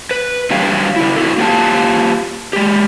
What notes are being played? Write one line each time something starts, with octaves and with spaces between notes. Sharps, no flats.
B4
D3 F#3 G3 G4 C#5 F5
C#3 E4
D#4 E4 F#4 A4
A#3 F4 G4 F5 A5
G#3 G4